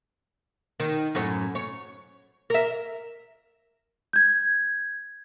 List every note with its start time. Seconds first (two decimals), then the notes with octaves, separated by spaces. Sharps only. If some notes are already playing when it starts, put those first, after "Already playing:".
0.80 D#3
1.15 F#2 A2 C#4
1.55 C#5
2.50 A#4 E5
4.13 G6 G#6